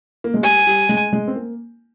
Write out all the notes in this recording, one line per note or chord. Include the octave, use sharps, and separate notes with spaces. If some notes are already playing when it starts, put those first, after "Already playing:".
A#3
G#3
G3 G#5
G3
G#3
G#3
C4
A#3